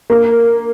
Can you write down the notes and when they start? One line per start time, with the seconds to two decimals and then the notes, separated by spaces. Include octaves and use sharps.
0.10 A#3